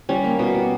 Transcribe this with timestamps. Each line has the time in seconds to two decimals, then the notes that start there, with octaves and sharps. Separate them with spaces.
0.09 G3 C#4
0.24 A#3
0.39 B2
0.55 B2